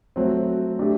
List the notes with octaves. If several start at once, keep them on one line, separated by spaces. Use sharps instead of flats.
F#3 A3 C4
A3 D4 G4